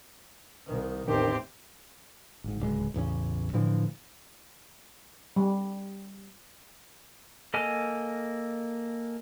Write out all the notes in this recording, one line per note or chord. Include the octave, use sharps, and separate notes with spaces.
C2 D#3
A1 E2 D#3 C4 G4
G#1 G#2
D1 C#2 G#3
A1 E2 C#3 C#4
A2 D3 E3 F3
G3
A#3 A4 D#5 G#5 F6